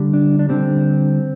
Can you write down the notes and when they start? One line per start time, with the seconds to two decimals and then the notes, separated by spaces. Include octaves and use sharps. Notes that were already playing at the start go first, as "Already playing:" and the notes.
Already playing: D3 G3
0.14 D4
0.39 D4
0.49 D3 G3 C4